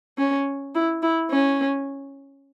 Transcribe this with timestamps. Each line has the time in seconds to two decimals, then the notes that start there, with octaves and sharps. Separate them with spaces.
0.18 C#4
0.75 E4
1.03 E4
1.31 C#4